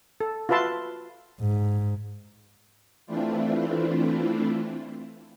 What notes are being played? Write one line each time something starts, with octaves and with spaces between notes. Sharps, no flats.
A4
F4 F#4 B4 E5 A5 C6
G#2
E3 A3 C4 D4 E4 F4